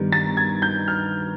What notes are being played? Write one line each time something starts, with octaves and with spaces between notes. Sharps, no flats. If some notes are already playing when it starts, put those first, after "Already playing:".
Already playing: G2 D#3 G3 B3
A6
G#6
G6
F6